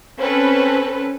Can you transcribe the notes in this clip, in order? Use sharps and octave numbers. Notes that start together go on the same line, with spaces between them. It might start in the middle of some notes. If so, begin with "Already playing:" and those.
C4 C#4 A4 B4